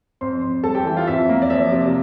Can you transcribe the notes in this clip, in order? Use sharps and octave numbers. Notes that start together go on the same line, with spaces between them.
F2 C5 C6
F2
G3 A4 A5
G4 G5
E3 G5
F4 F5
F2 E5
A#3
D5
F3 E5
C3